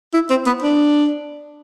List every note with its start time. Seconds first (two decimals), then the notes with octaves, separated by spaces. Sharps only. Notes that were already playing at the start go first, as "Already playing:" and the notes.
0.14 E4
0.30 C4
0.46 B3
0.62 D4